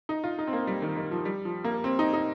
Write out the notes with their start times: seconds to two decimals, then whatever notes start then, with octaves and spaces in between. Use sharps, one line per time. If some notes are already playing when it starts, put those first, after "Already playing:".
0.09 D#4
0.24 F4
0.39 D#4
0.47 C4
0.53 A#3
0.67 G3
0.82 D#3
0.97 D#3
1.11 F3
1.25 G3
1.45 F3
1.64 A#3
1.84 C4
1.99 D#4
2.13 D#4